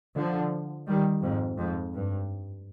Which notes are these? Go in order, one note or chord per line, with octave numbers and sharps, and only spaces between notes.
D3 F3
D#3 G3
F2 G#2
F2 G#2
G2